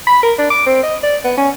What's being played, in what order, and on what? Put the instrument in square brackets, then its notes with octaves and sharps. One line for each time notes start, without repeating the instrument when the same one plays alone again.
[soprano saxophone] B5
A#4
D4
D6
C4
D#5
D5
B3
C#4